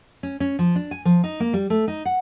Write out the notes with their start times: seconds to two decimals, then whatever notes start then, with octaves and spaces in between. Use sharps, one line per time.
0.23 C#4
0.40 C#4
0.59 F3
0.76 D4
0.91 G#5
1.05 F3
1.24 D#4
1.40 A#3
1.53 G3
1.70 A3
1.88 D#4
2.05 F#5